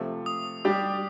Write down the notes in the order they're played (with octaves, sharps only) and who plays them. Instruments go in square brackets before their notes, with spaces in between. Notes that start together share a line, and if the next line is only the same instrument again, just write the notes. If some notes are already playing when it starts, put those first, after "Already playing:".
Already playing: [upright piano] C3 F3 A3
[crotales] D#6
[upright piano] G3 D4 G4